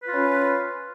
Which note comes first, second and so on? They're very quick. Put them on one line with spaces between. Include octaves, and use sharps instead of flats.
B4 F4 C#4